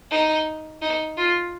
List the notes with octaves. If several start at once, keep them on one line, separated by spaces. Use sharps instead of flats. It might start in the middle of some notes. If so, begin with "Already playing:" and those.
D#4
D#4
F4